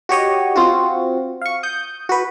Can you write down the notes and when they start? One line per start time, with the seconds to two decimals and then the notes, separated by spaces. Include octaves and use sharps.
0.09 F#4 G4 C#5 D#5
0.56 C4 F4 F#4
1.41 F5 C#6
1.63 D#6 G6
2.09 F#4 B4